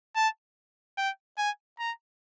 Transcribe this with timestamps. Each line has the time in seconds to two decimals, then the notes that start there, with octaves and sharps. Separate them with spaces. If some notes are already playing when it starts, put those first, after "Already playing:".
0.16 A5
0.98 G5
1.38 G#5
1.79 A#5